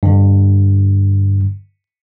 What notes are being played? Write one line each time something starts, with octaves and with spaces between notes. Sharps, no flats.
G2 D3